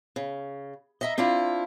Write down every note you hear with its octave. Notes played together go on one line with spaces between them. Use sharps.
C#3
D#5 E5 A#5
C4 D4 E4 F4